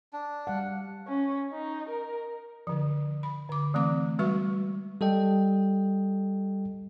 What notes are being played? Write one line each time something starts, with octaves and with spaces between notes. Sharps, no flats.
D4
G3 F5 F#5
C#4
D#4
A#4
D3 F3
B5
D3 D6
E3 A3 C4 D6
G3 G#3 F#4 B4 E5 C#6
G3 A4 D#5 G5